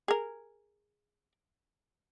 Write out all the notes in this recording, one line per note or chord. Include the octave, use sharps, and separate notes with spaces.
G#4 A#4